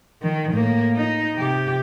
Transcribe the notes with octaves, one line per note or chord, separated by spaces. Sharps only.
D#3
A2 A#3
D#4
C3 G4